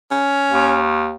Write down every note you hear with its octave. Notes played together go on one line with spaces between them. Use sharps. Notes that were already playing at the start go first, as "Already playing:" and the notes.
C#4
D#2